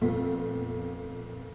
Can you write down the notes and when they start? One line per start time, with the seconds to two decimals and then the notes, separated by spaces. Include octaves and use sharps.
0.01 F2 A#2 A3 B3 C4